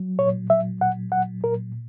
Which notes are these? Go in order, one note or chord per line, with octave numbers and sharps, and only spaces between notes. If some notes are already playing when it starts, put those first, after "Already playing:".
Already playing: F#3
A#2 C#5
F#3 E5
A#2 F#5
F#3 F#5
A#2 A#4